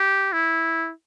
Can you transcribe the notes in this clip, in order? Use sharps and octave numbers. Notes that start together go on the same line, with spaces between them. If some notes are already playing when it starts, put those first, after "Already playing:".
Already playing: G4
E4